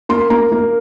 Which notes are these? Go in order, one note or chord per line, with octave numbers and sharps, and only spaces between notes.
A#3 C6
A#3 A#5
A#3